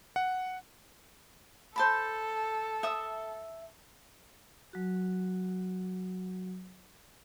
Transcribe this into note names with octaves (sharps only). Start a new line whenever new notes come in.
F#5
A4 C5 A5 B5
E5 D#6
F#3 F#4